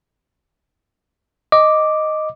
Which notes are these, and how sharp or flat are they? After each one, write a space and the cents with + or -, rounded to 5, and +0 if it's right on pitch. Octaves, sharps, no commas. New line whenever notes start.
D#5 +0 D6 +0